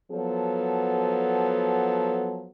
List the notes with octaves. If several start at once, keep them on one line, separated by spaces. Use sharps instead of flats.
F3 F#3 B3 A4